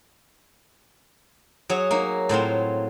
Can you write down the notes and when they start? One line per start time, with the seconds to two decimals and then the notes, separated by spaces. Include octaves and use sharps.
1.69 F#3 G#4 C#5
1.91 A#3 D#4
2.29 A2 F#3 C4 F4